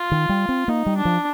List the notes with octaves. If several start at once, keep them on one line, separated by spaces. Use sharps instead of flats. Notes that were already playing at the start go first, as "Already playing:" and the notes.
Already playing: F4
D#3
G3
C4
A#3 D#4
G3
D4
F3